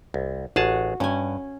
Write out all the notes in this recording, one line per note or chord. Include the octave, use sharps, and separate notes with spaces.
C2
A1 F#4 G#4 A5
G2 C#4 G#5